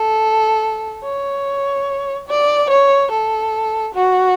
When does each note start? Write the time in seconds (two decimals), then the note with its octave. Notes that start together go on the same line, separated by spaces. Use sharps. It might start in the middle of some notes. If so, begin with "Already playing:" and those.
Already playing: A4
1.04 C#5
2.28 D5
2.70 C#5
3.11 A4
3.94 F#4